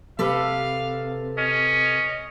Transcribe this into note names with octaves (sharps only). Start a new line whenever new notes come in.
C3 G4 A4 B4 F5
C#4 D#5